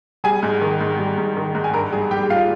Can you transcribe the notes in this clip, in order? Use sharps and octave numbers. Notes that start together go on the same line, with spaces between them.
G3 G#4 G#5
G#2
D#3
G#2
G3
G#2
D#3
G#2
G#5
G2 A#4 A#5
G3 G#4 G#5
G3 G4 G5
F4 F5